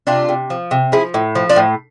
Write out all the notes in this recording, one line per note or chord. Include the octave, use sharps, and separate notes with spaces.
C3 D4 F4
C3
F3
C3
F3 E4 G#4
A2
F3
D4 F4
A2